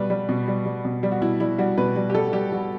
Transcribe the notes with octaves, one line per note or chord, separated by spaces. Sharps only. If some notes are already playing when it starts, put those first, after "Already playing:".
Already playing: B2 G3 B4
G3
B2
G3
G3
B2
G3
F#4
B2 E4
G3 E4
G3 F#4
B2 B4
G3
G4
G3 A4
G3 G4
G3 F#4